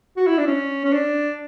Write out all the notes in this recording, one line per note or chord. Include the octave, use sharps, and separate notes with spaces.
F#4
E4
D4
C#4
C#4
D4